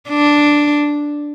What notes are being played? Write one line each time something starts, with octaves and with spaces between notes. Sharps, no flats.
D4